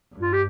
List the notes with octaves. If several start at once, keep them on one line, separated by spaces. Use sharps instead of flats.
G2
F4
G4